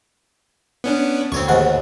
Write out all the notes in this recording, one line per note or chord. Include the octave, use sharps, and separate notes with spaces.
B3 C#4 D4
D2 C4 C#5 C#6
D#2 G#2 F#5